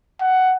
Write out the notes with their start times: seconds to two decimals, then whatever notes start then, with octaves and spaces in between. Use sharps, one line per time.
0.21 F#5